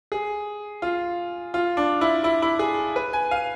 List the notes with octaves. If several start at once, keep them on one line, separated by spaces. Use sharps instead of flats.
G#4
F4
F4
D4
E4
E4
E4
G#4
B4
G#5
F5